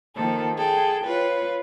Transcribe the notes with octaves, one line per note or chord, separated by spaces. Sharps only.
D#3 F3 A#3 A4
G#4 A4 G5
F4 B4 C#5